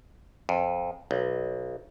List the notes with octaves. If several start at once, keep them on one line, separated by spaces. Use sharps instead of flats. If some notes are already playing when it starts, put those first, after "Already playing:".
F2
B1